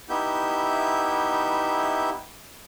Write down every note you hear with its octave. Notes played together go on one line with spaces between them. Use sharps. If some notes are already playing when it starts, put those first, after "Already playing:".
B3 D#4 E4 G4 E5 G6